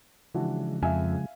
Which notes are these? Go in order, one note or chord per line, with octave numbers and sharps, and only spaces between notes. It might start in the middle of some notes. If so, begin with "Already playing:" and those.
C#3 E3 F3 G#3 D4 F#4
F2 E5 F5 G#5